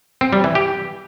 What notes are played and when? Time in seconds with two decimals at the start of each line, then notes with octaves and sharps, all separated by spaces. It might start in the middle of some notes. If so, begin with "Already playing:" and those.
0.21 C4
0.33 G3
0.44 E3
0.55 G4